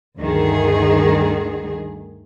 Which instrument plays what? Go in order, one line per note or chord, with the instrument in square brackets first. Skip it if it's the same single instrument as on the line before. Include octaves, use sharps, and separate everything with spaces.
[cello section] D2 G2 D#3 G#4